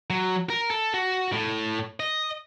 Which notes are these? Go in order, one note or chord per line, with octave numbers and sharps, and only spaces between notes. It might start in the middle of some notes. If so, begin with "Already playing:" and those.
F#3
A#4
A4
F#4
A2
D#5